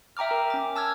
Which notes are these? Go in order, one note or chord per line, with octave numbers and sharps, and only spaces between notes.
E5 G5 A#5 D6 F6
A#4
C#4 D6
A5 E6 F6 G#6